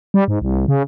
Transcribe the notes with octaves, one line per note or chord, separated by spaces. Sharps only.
G3
G#2
C2
C#3